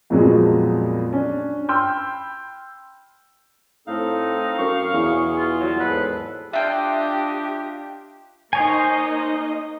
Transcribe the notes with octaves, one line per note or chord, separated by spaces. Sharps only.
F2 A#2 F3 F#3 G#3 B3
C#4 D4
G5 B5 C6 E6 F6 G6
A2 C4 D#4 A4 F5
F#2 C#6
E2 B2 G#4 C#5
F4
F#3 G3
D#2 G#2 G#3 A4 B4
D4 F4 G4 D#5 E5 G5 F#6
A#3 D#4 C5 C#5 D#5 G#5